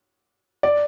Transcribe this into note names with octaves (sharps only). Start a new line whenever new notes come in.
D5